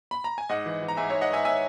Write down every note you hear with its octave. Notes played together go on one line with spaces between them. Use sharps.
B5
A#5
G#5
G#2 D#5 F#5
E3
E3
A#5
G#2 E5 G#5
C#5 E5
G#2
D#5 F#5
G#2 E5 G#5
E5 G#5